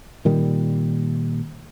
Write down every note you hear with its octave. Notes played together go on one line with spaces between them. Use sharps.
A#2 D#3 G3